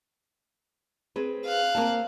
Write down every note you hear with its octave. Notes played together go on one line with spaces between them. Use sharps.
C4 G#4 B4
F5 F#6
A#3 C4 A5